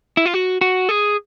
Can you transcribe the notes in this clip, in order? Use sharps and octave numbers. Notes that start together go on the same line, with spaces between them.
E4
F4
F#4
F#4
G#4